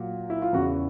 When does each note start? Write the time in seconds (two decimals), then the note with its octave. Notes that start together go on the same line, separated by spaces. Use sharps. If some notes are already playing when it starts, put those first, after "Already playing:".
Already playing: A#2 F#3
0.30 E4
0.42 F4
0.53 E2 C#3 E3 F#4